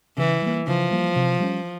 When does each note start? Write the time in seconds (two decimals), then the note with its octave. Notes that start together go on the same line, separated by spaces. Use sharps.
0.17 C#3 E3
0.42 G3 A#3
0.67 C#3 F3
0.91 G3 A#3
1.16 C3
1.40 G3 A#3 C#4